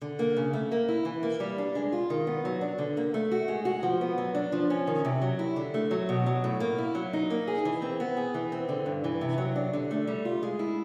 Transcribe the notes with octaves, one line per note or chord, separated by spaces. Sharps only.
D3
A#3
C#3
A3
A#3
E4
E3
A#3
G3
D4
G#3
F4
D#3
B3
F#3
D4
D3
A#3
A3
F#4
G#3
F#4
F3
B3
F#3
D4
F3
C#4
D#3
C3
F#3
E4
D3
A3
F#3
B2
F#3
A2
A#3
E4
F#3
D#4
A#3
G#4
E3
C4
B3
G#4
E3
C4
D3
G2
E3
C3
F#3
D4
D3
A3
G3
F4
G#3
E4